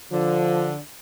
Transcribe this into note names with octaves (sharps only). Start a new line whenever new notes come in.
D3 F3